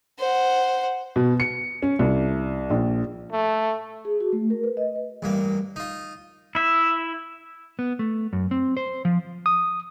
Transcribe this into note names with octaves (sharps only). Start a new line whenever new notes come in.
C5 F#5
B2
C#7
C#4
C2
A#1
A3
G#4
F#4
A3
A#4
B4
D#5
B4
A1 G2 A#3
D#4 F4
E4 E5
B3
A3
F#2
C4
C5
F3
D#6